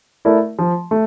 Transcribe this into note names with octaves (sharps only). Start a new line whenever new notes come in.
A3 E4 A#4 D5
F3
A3